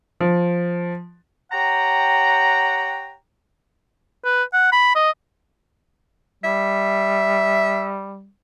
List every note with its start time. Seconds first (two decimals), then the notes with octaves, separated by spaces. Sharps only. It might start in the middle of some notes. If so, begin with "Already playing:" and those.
0.20 F3
1.52 G4 C#5 F#5 G5 A#5
4.25 B4
4.53 F#5
4.72 B5
4.95 D#5
6.44 G3 E5